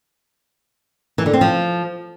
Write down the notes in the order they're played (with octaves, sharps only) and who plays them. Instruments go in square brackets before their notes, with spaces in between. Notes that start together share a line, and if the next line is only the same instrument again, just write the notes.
[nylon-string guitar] E3
D3
C4
F3